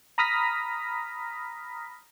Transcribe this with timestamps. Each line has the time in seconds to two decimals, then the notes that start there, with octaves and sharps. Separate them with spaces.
0.18 A#5 B5 D#6 F6 A#6 B6